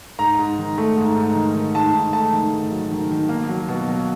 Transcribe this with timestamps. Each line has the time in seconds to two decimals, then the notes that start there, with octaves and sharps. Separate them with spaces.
0.19 G#2 A#5
0.39 G#2
0.58 D#3
0.78 A3
0.97 G#2
1.16 G#2
1.35 D#3
1.55 D#3
1.75 G#2 A5
1.94 G#2
2.13 A3 A5
2.33 D#3
2.52 G#2
2.71 F#3
2.91 D#3
3.11 D#3
3.29 A#3
3.49 F#3
3.68 B2
3.88 F#3